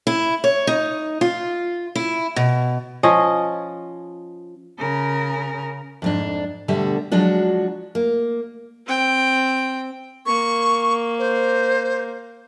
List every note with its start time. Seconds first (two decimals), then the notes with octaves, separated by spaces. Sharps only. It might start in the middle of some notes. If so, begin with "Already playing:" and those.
0.07 E4
0.44 C#5
0.67 D#4
1.21 F4
1.95 E4
2.36 B2
3.03 F3 C#4 D#5
4.79 C#3 A#4
6.02 F2 G#2 D4
6.68 D2 B2 D3 G3 E5 F#5
7.11 F3 F#3 G#3 D4 F#4
7.95 A#3
8.86 C4 G5
10.26 A#3 C#6
11.19 C5